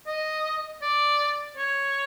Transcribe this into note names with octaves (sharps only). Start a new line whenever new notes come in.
D#5
D5
C#5